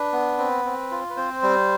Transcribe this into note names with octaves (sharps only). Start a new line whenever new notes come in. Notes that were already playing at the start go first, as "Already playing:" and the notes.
Already playing: D4 B4
B3
C4
C4
F4
B4
C4 C5
G3